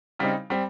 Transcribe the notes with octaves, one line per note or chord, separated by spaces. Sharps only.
C#3 G3 C4 D#4
G3 C4